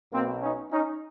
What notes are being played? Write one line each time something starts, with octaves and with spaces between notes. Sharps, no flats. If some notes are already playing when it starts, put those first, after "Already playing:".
B1 B2 A#3 C4
C#4 D#4
C#4 D#4